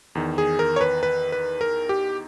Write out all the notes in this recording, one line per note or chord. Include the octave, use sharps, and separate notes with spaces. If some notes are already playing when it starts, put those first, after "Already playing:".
E2 D#3
G#4
A#4
C#5
B4
B4
B4
A#4
G4